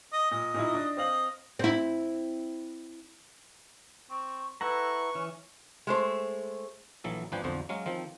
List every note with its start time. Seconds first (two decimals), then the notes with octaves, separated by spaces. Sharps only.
0.13 D#5
0.31 A#2 D#5
0.54 A#2 D#4 E4
0.74 D4
0.97 C4 D#5 F5 F#7
1.59 C4 E4
4.10 C4 C#6
4.61 E4 A4 B4 F#5 A#5 C#6
5.15 E3 C#4
5.87 G#3 A3 C5
7.04 A#1 E3 F#3 A4
7.32 G#1 F3 D4 B4 G5 G#5
7.44 B1 F2 D3 F3 F#4 C5
7.69 F#3 G#3 C#4 F5
7.86 D#3 F3 C4